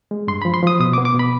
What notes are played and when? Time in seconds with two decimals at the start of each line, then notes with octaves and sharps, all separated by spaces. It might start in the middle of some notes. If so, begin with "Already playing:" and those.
0.11 G#3
0.28 G2 C6
0.42 F3 B5
0.54 C6
0.63 F3 D#6
0.80 B2 D#6
0.93 D6
0.98 B3
1.05 D6
1.15 B2 B5